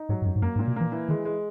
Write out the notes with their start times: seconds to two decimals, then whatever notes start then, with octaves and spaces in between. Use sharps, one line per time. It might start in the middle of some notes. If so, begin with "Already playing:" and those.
Already playing: D#4
0.09 G#2 F#3
0.22 G#2
0.26 F#2 F#3
0.36 G#2
0.42 F#2 A#3
0.56 G#2
0.59 A#2
0.67 B2
0.76 E3 A#3
0.92 E3
1.08 D#3 G#3
1.25 G#3